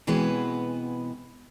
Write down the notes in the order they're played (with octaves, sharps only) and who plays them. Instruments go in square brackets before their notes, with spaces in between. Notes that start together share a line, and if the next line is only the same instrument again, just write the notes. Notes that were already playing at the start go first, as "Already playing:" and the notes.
[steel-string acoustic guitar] B2 E3 G#3 B3 C4 B4